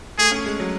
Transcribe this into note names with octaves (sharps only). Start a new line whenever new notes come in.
A3 G#4
C#4
G#3
F#3